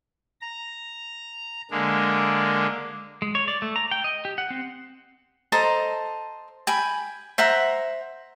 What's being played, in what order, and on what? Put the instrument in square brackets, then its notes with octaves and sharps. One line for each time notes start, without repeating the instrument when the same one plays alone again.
[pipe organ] A#5
D3 G#3 A#3 D4
[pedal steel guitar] G#3
C#5
D5
A3
A#5
G5
D#5
G4
F#5
C4
[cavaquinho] A4 C5 D#5 A#5
G5 G#5 B5
C5 E5 F#5 A#5